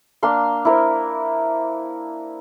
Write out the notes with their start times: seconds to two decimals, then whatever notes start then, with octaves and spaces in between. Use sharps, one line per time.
0.23 A#3 D4 F5 C6
0.65 E4 A#4 C5